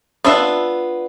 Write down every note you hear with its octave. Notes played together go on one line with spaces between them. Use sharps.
B3 D4 F4 E5